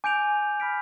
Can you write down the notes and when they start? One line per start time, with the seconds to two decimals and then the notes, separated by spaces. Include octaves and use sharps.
0.04 G#5 D6 G6 D7 F7
0.60 B5 F6 B6 D7